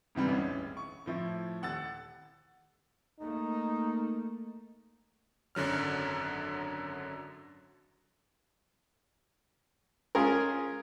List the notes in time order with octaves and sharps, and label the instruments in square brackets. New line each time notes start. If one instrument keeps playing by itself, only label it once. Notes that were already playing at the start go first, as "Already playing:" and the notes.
[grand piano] G#2 C3 E3 G3
E1 A1 C#4
C#6
A2 F3 E4
D#1 F#5 E6 A6
[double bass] A3 A#3 [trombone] D#4
[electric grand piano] G#1 F#2 D3 F#3 F6
[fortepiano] G#3 C#4 F4 G#4 A#4